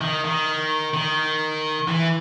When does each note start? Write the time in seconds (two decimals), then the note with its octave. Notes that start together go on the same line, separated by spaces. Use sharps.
0.01 D#3
0.24 D#3
0.94 D#3
1.88 E3